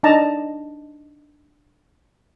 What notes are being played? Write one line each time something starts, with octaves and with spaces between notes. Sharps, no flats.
D4 D#4 D5 D#5 A5 A#5